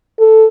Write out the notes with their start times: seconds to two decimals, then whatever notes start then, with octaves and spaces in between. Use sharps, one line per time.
0.19 A4